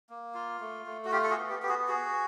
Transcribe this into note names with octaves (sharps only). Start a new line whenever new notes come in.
A#3
F4
A3
A3
F#4
F4 G4
A4
F#4 G#4
B3
G4
B3 G4
F#4 G#4
F#4 G#4